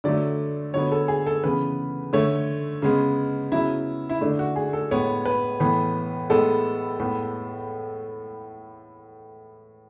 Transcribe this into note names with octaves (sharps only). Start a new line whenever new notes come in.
D3 F#3 A3 D5
D3 F#3 B3 C#5
A4
G#4
A4
C#3 E3 B3 B4
D3 A3 C#5
C#3 G#3 B3
C#3 F#3 B3 E4
E4
D3 A3 D4
F#4
G#4
A4
A2 G#3 B3 C#5
B4
A2 E3 B3
A2 G#3 B3 A4
A2 G#3 B3